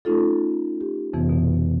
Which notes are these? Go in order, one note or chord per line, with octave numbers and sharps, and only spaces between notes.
A3 C#4 D#4 F4 A4
G4
F2 C3 E3 B3
B2